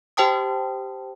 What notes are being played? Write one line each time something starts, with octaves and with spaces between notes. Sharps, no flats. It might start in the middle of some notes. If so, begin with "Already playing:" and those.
G4 C5 G5 A5 D#6